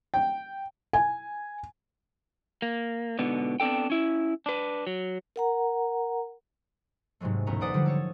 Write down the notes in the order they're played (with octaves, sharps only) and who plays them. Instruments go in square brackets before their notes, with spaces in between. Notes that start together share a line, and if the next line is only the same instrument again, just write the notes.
[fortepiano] G5
[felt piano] G#5
[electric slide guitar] A#3
G#2 B2 D3 B3
B3 C4 D4 A4 G5
C#4 E4
D4 B4
F#3
[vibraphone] A#4 F#5 A#5
[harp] G#2 C3 F#3 G#3 A3
E1 D2 A3 B3 C#4 A#5
A4 B4 C5 D5 F#5 D#6
D3 F3 G3 A#3
A4 C#5 D#6